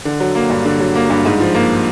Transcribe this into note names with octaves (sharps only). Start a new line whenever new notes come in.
D3
F#3
A#3
G2
D3
F#3
A#3
G2
G#2
F3
A#3